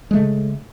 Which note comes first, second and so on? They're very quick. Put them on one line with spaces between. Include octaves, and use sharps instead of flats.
G#3 A3 C#3